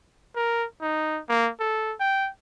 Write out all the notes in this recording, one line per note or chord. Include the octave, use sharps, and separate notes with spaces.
A#4
D#4
A#3
A4
G5